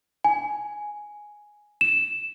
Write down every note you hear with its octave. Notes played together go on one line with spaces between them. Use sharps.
G#5
E7